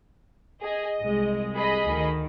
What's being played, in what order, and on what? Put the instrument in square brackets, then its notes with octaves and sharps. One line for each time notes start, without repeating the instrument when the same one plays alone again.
[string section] G#4 [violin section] D#5
[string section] C2 G#3
[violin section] G#4 D#5 B5
[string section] D2 D#3